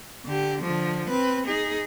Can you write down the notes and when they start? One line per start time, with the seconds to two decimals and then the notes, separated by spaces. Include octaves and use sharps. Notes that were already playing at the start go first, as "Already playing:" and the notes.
0.25 D3 G4
0.62 D3 F3
1.09 C4 B4
1.47 D#4 G#4